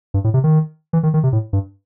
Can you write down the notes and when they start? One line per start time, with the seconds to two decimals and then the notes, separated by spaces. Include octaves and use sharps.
0.14 G2
0.24 A2
0.34 C3
0.44 D#3
0.93 E3
1.03 D#3
1.14 D#3
1.23 C3
1.33 A2
1.53 G2